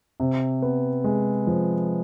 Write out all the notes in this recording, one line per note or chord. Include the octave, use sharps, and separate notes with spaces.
C3
B3
G#3
F3